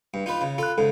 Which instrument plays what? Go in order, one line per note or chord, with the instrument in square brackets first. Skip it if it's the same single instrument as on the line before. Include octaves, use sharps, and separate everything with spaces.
[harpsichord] G2
D#4 F4 B4
C#3
[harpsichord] F4 A4 [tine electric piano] B5 F#6
[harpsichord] G#2 C#3 [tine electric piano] A4